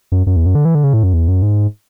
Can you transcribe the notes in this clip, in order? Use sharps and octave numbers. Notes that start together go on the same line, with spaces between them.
F#2
F#2
E2
F#2
D3
E3
D3
C#3
A2
F#2
E2
F#2
G#2